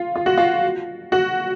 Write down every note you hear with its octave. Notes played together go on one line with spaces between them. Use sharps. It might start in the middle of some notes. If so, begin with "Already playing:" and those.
Already playing: F4
F4
F#4
F4
F#4